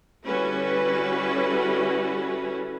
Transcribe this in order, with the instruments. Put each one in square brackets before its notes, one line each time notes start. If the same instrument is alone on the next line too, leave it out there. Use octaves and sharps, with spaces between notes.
[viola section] D3 G3 C#4 E4 F#4 B4